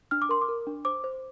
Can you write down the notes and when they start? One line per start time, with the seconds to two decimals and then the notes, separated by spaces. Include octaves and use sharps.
0.11 D4 F6
0.22 D6
0.29 A#4 C6
0.42 D6
0.49 A#4
0.67 D4
0.85 C5 D6
1.04 C5